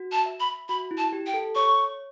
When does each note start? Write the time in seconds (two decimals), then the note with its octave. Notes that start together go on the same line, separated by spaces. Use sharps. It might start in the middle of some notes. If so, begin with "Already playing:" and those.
Already playing: F#4
0.12 A5
0.26 E5
0.40 B5
0.69 F#4 B5
0.91 E4
0.98 A5
1.13 G4
1.26 G5
1.34 A4
1.55 C#5 C#6